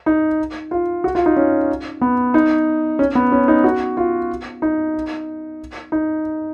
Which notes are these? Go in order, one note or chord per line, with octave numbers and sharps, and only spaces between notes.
D#4
F4
F#4
F4
D#4
C#4
B3
D#4
C#4
B3
C#4
D#4
F#4
F4
D#4
D#4